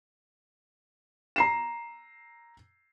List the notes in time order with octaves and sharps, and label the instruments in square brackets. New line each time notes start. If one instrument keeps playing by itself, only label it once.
[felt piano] A#5 C7 E7